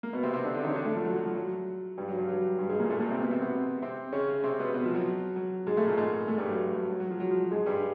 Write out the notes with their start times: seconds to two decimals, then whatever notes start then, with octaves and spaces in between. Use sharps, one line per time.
0.03 A#3
0.13 B2 B3
0.23 C3 C4
0.33 C3 C4
0.44 D3 D4
0.54 D3 D4
0.64 D#3 D#4
0.70 C#4
0.75 D3 D4
0.84 A2 A3
0.95 F3
1.05 F#3
1.16 F#3
1.26 F3
1.36 F#3
1.98 G2 G3
2.08 F#3
2.18 G2 G3
2.28 F#3
2.59 G2 G3
2.69 G#2 G#3
2.80 A#2 A#3
2.89 A2 A3
3.00 A#2 A#3
3.10 C3 C4
3.21 B2 B3
3.31 C3 C4
3.41 B2 B3
3.82 C3 C4
4.13 C#3 C#4
4.44 C3 C4
4.59 B2 B3
4.74 B2 B3
4.85 F3
4.95 F#3
5.36 F#3
5.67 G#2 G#3
5.77 A2 A3
5.87 A#2 A#3
5.97 G#2 G#3
6.28 A2 A3
6.38 G2 G3
6.49 F#3
6.75 F#3
6.90 F#3
7.00 F#3
7.10 F3
7.20 F#3
7.31 F3
7.41 F#3
7.51 G#2 G#3
7.66 G2 G3